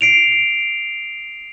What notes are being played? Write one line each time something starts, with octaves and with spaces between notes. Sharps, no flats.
C7 D7 F7